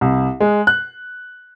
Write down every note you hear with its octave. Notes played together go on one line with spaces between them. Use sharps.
C2
G#3
F#6